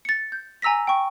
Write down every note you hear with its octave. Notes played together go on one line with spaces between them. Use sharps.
A6 C#7
G6
G#5 A#5 E6 A#6 B6
G5 C#6